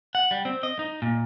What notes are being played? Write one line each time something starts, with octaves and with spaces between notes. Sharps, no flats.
F#5
G3
C4
D#5
D#4
A#2